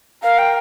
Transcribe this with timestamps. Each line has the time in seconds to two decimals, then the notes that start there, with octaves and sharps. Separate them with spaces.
0.23 A#4 F5
0.38 G5